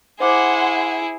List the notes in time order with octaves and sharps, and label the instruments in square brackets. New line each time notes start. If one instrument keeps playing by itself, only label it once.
[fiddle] E4 G#4 [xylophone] C5 D6 [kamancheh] F#5 C6